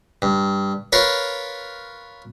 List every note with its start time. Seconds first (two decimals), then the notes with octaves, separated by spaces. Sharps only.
0.22 G2
0.92 F4 A#4 B4 C#5